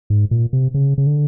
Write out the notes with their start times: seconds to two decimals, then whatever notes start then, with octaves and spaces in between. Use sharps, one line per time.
0.10 G#2
0.31 A#2
0.53 C3
0.74 C#3
0.98 C#3
1.07 D3